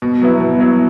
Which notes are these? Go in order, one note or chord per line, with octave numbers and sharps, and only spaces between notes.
B2
F#3 B3 E4
B2
F#3 B3 E4